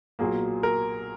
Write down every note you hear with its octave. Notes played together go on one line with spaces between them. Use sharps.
B1 A#2 F#3 A#3 G#4
A#4